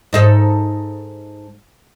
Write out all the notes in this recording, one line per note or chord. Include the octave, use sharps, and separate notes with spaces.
G#2 D#4 A4